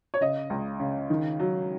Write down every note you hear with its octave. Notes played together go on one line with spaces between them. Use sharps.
C#5
C#3 D#5
C#2
C#3
D#3
F#3